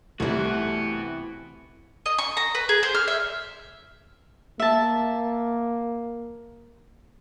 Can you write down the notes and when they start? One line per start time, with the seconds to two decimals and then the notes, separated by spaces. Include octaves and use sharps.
0.20 C2 C3 E3 G3 A3 B3 F#4
2.06 D#5
2.18 C#6
2.37 A#5
2.55 B4
2.69 G#4
2.83 C5
2.95 F6
3.08 E5
4.60 A#3 E5 A5